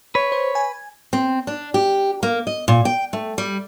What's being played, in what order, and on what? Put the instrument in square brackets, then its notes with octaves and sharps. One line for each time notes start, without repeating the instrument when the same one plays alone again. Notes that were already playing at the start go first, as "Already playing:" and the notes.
[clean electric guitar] B4 [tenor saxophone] C#5
[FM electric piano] C5
G#5
[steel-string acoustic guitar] C4
D4
G4
A#3
D#5
A#2
G5
A3
G3